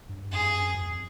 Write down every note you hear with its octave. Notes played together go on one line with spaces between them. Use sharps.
G2
F2 G#4
G2
F#2
F2